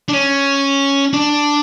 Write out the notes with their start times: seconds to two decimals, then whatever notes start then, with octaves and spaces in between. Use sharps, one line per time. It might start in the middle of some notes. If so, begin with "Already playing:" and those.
0.09 D4
0.13 C#4
1.13 D4